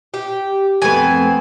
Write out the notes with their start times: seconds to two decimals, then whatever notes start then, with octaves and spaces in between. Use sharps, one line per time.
0.14 G4
0.82 F2 A3 B3 C4 G#5